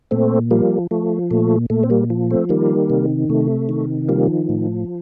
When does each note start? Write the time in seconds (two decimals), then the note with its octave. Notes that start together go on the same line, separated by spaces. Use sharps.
0.11 A#2 A3 C4
0.51 F3 G3 A#3
0.91 F3 A3
1.31 A#2 A3
1.70 A#2 A3
1.83 C4
1.90 G3 A#3
2.10 F3
2.31 A3 C4
2.49 D#3 G3 A#3
2.90 C3
3.29 C3 A3
3.69 D#3
4.08 F3 G3 A#3
4.49 A2